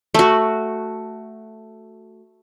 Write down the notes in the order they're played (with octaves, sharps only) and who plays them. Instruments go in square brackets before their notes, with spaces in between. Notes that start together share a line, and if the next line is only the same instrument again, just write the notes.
[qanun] A3 F#4